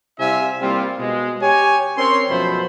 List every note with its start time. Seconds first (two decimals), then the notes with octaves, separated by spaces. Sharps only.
0.20 C3 G3 E4 E5 F5 G#5
0.62 G3 A#3 C4 E4 F4
0.98 B2 G#3
1.41 G4 C#5 G#5
1.98 C4 C#4 A#4 C#5 C6
2.29 F#2 B2 F3 A3 C5 B5